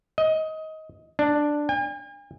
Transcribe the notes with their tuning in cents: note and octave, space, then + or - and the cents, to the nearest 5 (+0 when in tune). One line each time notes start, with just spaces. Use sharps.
D#5 +20
D4 +5
G#5 -45